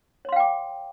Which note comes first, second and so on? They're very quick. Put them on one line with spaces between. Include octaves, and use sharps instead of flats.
C#5 C6 F5 G5 D6